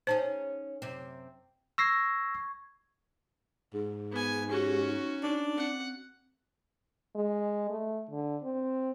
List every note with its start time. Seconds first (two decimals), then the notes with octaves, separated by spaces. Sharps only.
0.07 C#4 D#4 G#4 C5 A5
0.82 F#2 C3 C4
1.78 C#6 E6 G#6 A#6 C7
3.74 G#2
4.12 B3 G#5
4.51 C#4 F#4 G4
4.87 D#4
5.23 D4
5.57 C4 F#5
7.16 G#3
7.70 A3
8.11 D3
8.43 C4